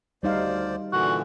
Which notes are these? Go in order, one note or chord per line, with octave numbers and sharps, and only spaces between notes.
D2 G3 D#4 C5 D5 F5
A#2 D3 E3 F#4